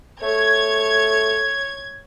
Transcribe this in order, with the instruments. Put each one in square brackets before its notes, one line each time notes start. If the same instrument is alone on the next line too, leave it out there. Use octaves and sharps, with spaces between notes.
[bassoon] A3 [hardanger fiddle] C#5 [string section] G#6